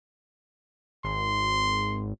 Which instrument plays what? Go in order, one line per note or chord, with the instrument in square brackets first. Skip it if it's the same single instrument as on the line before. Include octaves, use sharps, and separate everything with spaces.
[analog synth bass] G#1 [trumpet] C6